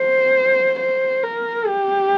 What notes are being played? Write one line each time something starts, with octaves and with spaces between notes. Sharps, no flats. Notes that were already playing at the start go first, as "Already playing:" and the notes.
Already playing: C5
C5
A#4
G4